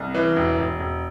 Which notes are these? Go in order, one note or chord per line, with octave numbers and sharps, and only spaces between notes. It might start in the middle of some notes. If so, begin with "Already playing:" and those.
Already playing: C2
E3
E1
E1
E1